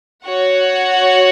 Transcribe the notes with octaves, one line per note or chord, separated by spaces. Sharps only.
F#4 C#5 F#5